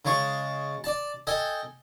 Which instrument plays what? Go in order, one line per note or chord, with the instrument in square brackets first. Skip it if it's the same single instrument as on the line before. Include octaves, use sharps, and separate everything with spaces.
[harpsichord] C#3 G#3 C#5 A5 C#6
D5 A5
A4 D#5 G5 G#5